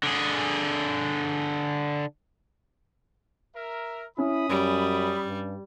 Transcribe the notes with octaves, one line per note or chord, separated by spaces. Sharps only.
D3 G#4
A#4 E5
C#4 E4 B5 D#6
F#2 G3
G2